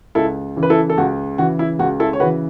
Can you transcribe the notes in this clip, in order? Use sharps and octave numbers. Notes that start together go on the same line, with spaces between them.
C#2 E4 A4
C#3 E3
B4
E4 A4
A4
C#2 F#4
C#3 E3 F#4
E4
C#2 F#4
E4 A4
C#5
C#3 E3 F#4 B4